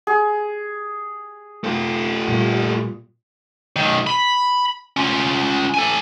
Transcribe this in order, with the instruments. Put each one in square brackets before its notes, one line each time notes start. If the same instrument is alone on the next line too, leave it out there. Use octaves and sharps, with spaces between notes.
[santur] G#4
[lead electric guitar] A3 F4
[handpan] A#2 G3
[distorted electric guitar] B1 D#3
B5
C#4 F4
A4 G#5